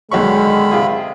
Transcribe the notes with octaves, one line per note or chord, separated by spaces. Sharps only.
B1 D3 D#3 F#3 G#3 B5 C#6
C3 F4 G#4